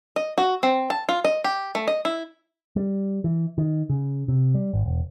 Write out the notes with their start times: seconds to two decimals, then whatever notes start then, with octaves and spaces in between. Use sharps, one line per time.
0.16 D#5
0.38 F#4
0.63 C4
0.90 A5
1.09 F4
1.24 D#5
1.44 G4
1.75 A3
1.88 D#5
2.05 E4
2.76 G3
3.24 E3
3.58 D#3
3.90 C#3
4.28 C3
4.54 G3
4.74 G#1
4.86 E1